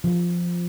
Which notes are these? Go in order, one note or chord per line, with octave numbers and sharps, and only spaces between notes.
F3